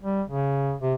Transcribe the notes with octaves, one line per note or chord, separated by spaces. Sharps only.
G3
C#3
C3